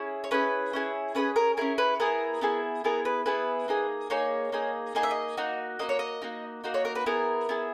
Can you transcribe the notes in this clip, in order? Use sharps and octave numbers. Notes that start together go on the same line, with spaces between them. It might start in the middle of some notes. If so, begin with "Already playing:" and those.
Already playing: C#4 E4 G#4
C#5
C#4 E4 G#4 B4
C#4 E4 G#4
C#4 E4 G#4 B4
A#4
C#4 E4 G#4 A#4
B4
B3 E4 G#4 A#4
B3 E4 G#4
B3 E4 G#4 A#4
B4
B3 E4 G#4 B4
A#3 D#4 G#4
A#3 D#4 G#4 C#5
A#3 D#4 G#4
A#3 D#4 G#4 D#5
E5
D#5
A#3 D#4 F#4
A#3 D#4 F#4 D#5
C#5
D#5
A#3 D#4 F#4
A#3 D#4 F#4
C#5
A#4
B4
B3 E4 G#4 A#4
B3 E4 G#4